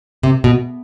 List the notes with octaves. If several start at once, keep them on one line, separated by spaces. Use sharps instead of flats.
C3
B2